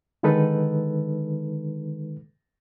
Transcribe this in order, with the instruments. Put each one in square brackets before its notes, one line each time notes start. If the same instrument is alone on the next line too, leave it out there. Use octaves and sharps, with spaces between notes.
[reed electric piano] D3 D#3 G#3 D#4 A4 B4